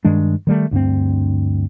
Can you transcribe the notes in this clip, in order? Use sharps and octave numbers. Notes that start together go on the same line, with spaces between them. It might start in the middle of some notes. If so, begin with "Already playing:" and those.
G2 D#3 G#3 D4
D#3 G3 A3
D2 G2 A3 C4